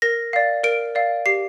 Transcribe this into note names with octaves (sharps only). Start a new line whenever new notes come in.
A#4 A#6
D5 F5
A#4 D7
D5 F5
G4 C7